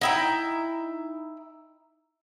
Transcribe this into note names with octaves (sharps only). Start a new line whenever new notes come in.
D#4 E4 G5